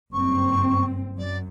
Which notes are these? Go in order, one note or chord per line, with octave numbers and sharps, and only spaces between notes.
F#1 G2 C4 C#6
F#2 D5